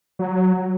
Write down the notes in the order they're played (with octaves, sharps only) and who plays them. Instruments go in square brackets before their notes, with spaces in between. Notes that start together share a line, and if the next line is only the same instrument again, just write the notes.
[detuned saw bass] F#3